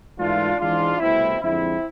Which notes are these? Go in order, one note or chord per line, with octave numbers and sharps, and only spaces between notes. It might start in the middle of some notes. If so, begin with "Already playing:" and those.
G#2 E3 A3 D4 F4
G#2 E3 G#3 D4 F4
C2 B2 A3 C4 E4
F2 D3 G#3 C4 E4